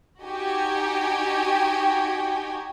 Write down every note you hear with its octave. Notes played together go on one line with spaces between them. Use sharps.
D#4 F#4 G4 G5 G#5